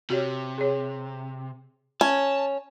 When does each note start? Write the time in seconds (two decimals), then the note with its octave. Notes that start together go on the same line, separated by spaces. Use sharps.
0.10 C3 F#4 G4 C#5
0.58 G#4 C#5
2.01 C#4 A5